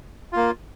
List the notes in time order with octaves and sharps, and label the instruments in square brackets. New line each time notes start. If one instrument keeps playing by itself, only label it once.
[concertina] A#3 F4